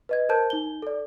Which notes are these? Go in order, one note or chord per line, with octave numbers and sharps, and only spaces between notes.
B4 D#5 G#6
A#4 C5 A5 G6
D#4 G7
A4 D5